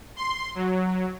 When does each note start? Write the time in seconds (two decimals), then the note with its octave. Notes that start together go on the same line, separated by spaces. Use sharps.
0.16 C6
0.55 F#3